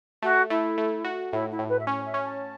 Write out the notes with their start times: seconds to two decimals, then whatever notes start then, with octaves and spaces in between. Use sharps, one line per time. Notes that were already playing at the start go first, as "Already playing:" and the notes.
0.23 A3 F#4
0.50 A3 E4
0.78 A3
1.05 F#4
1.32 A2 E4
1.51 E4
1.59 A2
1.69 B4
1.79 E5
1.87 C#4 C#5
2.05 E5
2.14 C#4
2.24 A5